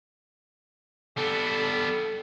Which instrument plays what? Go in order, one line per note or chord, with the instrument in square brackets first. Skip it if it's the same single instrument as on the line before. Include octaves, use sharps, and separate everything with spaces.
[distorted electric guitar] G3 B3 [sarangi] A4